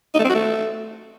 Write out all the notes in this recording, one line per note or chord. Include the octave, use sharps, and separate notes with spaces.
D#4
A3
C4
F#4
A3